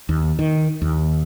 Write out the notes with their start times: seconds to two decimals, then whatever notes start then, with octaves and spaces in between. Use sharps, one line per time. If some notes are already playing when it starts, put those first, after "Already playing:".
0.09 D#2
0.39 D#3
0.82 D#2